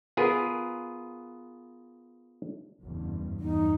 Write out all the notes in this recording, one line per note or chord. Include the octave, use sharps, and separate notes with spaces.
B3 F4 G#4 A#4 B4
F#1 E2 G2
E2 G2 D#4